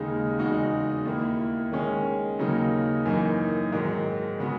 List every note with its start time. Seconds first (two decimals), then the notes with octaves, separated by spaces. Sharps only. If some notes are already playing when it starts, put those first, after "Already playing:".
Already playing: D#2 C#3 G#3 D#4
0.39 E2 C#3 G#3 D#4 F#4
1.05 D#2 D#3 A#3 E4
1.72 D#3 G#3 C#4 G#4
2.39 D#2 C#3 F#3 A#3 D#4
3.05 F#2 E3 A#3 D#4
3.73 G#2 D#3 F#3
4.39 C#3 G#3 B3 F#4